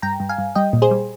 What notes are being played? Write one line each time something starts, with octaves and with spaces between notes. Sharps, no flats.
G2 G5 A#5
G2
F5 G#5
G2
G3 D#5 G5
A#2
G#4 C5
G3